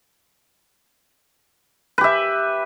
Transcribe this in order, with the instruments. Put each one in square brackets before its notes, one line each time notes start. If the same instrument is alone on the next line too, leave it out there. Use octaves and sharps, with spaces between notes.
[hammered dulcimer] B4
G4
E5